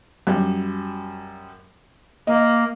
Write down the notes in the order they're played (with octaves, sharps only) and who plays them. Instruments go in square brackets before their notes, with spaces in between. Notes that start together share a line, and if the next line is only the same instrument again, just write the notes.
[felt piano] F#2 G3
[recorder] A#3 [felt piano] D#5